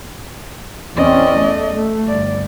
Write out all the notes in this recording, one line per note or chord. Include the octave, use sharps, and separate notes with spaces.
E2 C4 C#4 D5 D#5
A3
A3
G1 D5